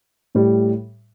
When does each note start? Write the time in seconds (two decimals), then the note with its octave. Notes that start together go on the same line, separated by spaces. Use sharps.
0.35 A2 G3